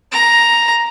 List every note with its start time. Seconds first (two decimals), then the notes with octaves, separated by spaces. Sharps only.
0.12 A#5